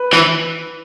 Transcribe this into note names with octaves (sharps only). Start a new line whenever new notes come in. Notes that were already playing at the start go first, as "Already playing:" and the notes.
Already playing: B4
E3